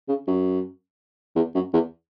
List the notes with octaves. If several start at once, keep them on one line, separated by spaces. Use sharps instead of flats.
C#3
F#2
E2
F#2
E2